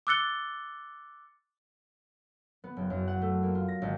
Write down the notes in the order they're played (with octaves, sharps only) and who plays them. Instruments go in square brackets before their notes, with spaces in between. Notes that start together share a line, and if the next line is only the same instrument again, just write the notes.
[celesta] D6 E6 F#6 A6 C#7 G7
[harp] B3
F#1
F#2
F#5
A3
A#3
F4
A#6
G#1